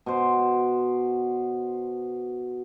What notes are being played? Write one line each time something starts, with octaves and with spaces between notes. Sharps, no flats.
B2 C5